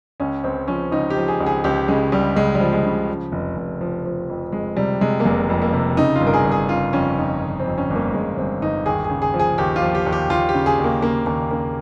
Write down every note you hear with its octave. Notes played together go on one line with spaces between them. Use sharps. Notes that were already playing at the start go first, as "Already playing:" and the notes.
C#2 C#4
C#2 C4
F3 C#4
C#2 D#4
G4
F3
G#4
C#2
G#4
C#2 G4
C#3 G#3
C#2 G3
C#2 G#3
G3
F3
G#3
C#3
F3
F1
F1
F3
F3
F2
F2 G#3
C3 G3
C3 G#3
A#3
F1 G#3
F2
A#3
C3
C#3 D#4
F4
G1
A#4
G#4
G1
G#4
C#3 F4
F2 C#4
F2 D#4
G1
C4
F2
C#4
G1
A#3
G1 G#3
G1 C4
G1 D#4
D#2 G#4
G#4
C#3
G#4
F3
G#4
D#2 G4
F4
F3
G4
D#2
G4
D#2 F4
G4
C#3
G#4
D#2
A#3
C#3 A#3
D#2 A#3
C#3 A#3